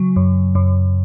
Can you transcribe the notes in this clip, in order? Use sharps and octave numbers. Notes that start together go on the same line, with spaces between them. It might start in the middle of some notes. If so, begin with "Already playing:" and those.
Already playing: C#3 F#3
F#2
F#2